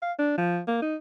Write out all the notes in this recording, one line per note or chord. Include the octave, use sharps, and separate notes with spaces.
F5
D4
F3
A#3
D#4